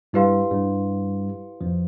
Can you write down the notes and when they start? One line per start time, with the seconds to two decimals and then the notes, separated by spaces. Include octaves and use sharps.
0.13 G2 G3 E4 G4 B4 F5 C6
0.51 G2 G3
1.61 F2 F3